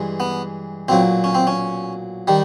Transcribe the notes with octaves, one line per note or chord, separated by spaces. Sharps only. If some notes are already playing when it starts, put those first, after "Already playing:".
Already playing: G2 E3 G#3
B3
B1 A#2 F#3 C4
C#4
C4
C#4
D#3 G3